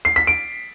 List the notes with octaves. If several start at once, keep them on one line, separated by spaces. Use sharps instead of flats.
C7
B6
D7